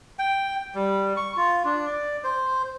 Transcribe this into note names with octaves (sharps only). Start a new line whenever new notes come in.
G5
G3
C#6
F4
D4
D5
C5